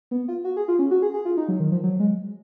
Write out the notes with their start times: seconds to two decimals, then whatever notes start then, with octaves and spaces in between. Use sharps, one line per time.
0.11 B3
0.28 F4
0.45 F#4
0.57 G#4
0.68 F4
0.79 C#4
0.91 F#4
1.02 G#4
1.14 G#4
1.25 F4
1.37 D#4
1.49 F#3
1.60 D#3
1.72 F3
1.84 F#3
2.00 G#3